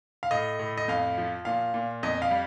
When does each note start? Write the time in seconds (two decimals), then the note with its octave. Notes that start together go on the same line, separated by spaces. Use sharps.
0.23 F5
0.31 A2 D#5
0.59 A2
0.78 D#5
0.88 F2 F5
1.17 F3
1.45 A#2 F5
1.74 A#2
2.03 F2 D#5
2.22 F5
2.31 G3